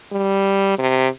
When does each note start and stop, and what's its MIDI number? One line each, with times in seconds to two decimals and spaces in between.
0.12 0.78 55
0.78 1.08 48